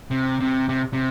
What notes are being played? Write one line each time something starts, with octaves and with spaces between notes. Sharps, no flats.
C3
C3
C3
C3